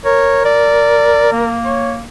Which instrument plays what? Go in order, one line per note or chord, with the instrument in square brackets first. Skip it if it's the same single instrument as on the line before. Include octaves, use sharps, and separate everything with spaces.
[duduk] A#4 [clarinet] C#5
[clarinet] D5
A#3
[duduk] C#5